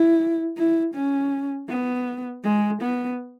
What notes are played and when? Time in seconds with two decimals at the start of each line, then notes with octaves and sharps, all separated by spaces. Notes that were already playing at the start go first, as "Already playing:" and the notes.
Already playing: E4
0.57 E4
0.94 C#4
1.69 B3
2.44 G#3
2.82 B3